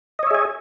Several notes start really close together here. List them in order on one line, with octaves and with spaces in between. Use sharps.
D#5 C#5 E5 G#4 G#5